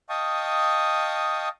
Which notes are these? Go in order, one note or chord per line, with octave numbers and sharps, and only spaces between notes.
D#5 F5 G5 A5 C#6 D#6